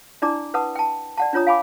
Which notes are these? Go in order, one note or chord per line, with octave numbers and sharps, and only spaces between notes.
D4 E4 D5 A5 A#5 D6
B4 F#5 A5 D#6
G5 A5
D5 F#5 A5
D4 F4 C#5 A#5 D#6
F5 G#5 B5 D6